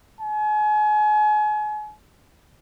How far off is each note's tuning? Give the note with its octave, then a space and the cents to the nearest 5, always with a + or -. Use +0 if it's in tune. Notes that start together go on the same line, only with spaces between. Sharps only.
G#5 +35